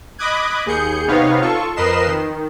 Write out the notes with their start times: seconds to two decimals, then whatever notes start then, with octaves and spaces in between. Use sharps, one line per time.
0.18 D#5 B5 D6 D#6 F#6 G#6
0.66 D#2 G#4 G6 C#7
1.08 C3 B3 D#4 C#5 F5
1.41 F4 A4 C#6
1.76 F2 A#4 B4 D#5 C7 E7
2.07 D#3